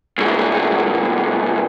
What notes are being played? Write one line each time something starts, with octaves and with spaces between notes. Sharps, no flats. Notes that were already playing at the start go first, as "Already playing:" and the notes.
C2 G#2